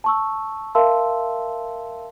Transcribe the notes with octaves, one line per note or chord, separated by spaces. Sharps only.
A5 C#6 E6
A#4 E5 F5 A5 C6 E6